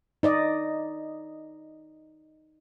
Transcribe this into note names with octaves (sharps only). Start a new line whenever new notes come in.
D#4 D5 D#5